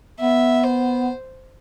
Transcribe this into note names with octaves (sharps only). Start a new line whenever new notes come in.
B3 E5
C5